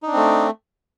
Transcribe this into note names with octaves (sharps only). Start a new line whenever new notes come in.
A3 C4 D4 D#4